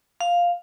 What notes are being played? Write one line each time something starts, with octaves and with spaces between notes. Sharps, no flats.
F5